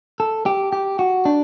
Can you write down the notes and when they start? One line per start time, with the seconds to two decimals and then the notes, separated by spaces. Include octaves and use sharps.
0.20 A4
0.46 G4
0.73 G4
0.99 F#4
1.25 D4